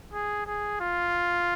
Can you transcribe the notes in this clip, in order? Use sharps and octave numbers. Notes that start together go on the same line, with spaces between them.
G#4
G#4
F4